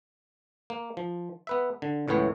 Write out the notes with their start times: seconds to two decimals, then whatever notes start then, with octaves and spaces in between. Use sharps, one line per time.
0.70 A#3
0.97 F3
1.47 B3 B4 E5
1.82 D3
2.08 C#2 A2 E3 B3 C#5